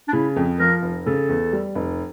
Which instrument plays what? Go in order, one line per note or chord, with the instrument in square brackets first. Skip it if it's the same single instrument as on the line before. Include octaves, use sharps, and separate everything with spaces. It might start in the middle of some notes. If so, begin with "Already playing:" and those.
[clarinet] D4
[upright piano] C#3 [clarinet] E4
[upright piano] F2
[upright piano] F3 [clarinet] A#4
[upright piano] F1
[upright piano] C#3 [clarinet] A4
[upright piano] E2
G3
F1